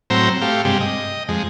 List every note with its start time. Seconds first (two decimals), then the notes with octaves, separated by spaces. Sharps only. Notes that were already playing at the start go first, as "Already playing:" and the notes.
0.10 A2 F#3 C4 C5 A#5 E6
0.42 A3 G4 F5
0.65 G2 C3 G#3 G4
0.81 D#5
1.29 F2 G#3